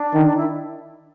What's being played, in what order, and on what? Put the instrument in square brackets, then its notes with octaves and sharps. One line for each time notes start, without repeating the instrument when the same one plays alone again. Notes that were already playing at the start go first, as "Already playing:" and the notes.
Already playing: [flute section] D4
[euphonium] D#3
[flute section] E4